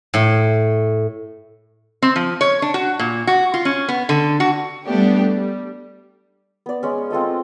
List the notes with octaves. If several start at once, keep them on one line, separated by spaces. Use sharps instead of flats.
A2
C4
F3
C#5
D4
F#4
A#2
F#4
F4
C#4
B3
D3
F#4
G3 A3 B3 D4 G4
G3
B3 D5
G#3 C#4
C4 F4 A4 D#5